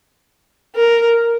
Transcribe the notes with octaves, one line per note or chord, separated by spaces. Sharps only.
A#4